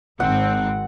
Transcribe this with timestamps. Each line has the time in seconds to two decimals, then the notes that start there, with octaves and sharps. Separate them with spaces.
0.20 G#1 G#2 C4 F#5